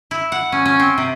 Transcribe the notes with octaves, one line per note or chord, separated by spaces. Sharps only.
E4
F#5
C#4
C#4
C4
C3